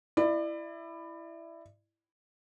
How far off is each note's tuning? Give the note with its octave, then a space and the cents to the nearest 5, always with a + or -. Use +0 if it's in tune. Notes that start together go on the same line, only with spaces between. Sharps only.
E4 +10 D5 +30